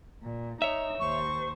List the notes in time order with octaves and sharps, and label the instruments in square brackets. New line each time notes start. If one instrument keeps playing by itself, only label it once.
[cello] A#2
[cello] D#4 [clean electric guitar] C#5 E5
[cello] D#2 C5 [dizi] C#6